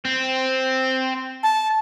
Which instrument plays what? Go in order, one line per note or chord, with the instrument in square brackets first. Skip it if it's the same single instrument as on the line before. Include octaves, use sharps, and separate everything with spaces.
[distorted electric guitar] C4
[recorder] A5